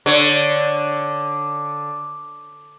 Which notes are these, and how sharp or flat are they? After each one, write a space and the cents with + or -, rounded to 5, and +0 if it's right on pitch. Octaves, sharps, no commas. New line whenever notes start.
D3 +0 C#5 +0